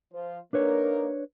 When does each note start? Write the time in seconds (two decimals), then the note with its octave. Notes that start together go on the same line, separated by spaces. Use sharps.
0.12 F3 F4 C5
0.53 A#3 D4 D#4 A#4 B4 C#5